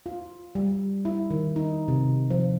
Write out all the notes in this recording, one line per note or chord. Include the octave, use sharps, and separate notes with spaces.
F4
G3
E4
D#3
D#4
C3
F3